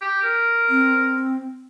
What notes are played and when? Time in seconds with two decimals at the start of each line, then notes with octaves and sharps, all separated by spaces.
0.01 G4
0.22 A#4
0.69 C4